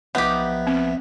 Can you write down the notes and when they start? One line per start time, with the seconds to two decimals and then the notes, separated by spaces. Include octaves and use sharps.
0.15 B1 F3 B3 D#4 G4 E5
0.67 C4